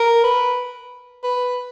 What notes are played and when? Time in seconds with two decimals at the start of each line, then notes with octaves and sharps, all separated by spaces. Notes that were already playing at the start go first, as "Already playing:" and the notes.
Already playing: A#4
0.24 B4
1.24 B4